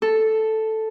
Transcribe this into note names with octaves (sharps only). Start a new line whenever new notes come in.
A4